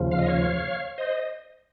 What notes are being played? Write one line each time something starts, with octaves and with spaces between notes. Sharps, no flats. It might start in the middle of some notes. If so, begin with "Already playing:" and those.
Already playing: D#2 C#3 F3
F5
D#5
C#5 F5
C5 D#5
D#5